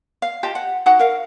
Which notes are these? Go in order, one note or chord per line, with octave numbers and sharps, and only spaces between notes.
F5
F4 G4 D#5 A5
F#5
D#4 F#4 F#5
A#4 F5